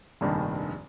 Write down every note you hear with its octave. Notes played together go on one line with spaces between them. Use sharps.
F1 A#1 G2 D#3